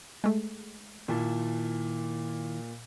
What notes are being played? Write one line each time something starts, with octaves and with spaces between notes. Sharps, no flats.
G#3 A3
A#2 D#3 E4 A5